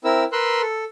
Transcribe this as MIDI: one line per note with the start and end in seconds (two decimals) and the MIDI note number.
0.04 0.24 60
0.04 0.24 64
0.04 0.24 70
0.04 0.24 88
0.32 0.61 70
0.32 0.61 71
0.32 0.61 84
0.32 0.61 88
0.32 0.61 90
0.61 0.84 69